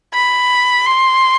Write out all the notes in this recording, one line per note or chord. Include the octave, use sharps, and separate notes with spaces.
B5
C6